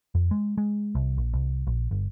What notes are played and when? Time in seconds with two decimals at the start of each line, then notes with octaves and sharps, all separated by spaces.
0.15 F2
0.31 G#3
0.58 G#3
0.95 C2
1.18 A#1
1.33 C2
1.67 A#1
1.91 G1